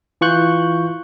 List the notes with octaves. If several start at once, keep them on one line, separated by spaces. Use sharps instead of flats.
E3 F4 C#6 F#6 G6